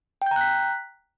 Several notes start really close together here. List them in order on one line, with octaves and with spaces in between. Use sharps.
G5 G6 A#5 F#6 B6